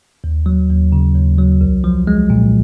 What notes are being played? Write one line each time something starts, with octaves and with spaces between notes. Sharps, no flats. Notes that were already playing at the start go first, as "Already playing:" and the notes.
D#2
F#3
D#2
C#3
D#2
F#3
C2
F3
G#3
A#2